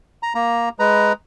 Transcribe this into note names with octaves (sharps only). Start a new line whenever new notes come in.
A#5
A#3 A#5
G#3 B4 A#5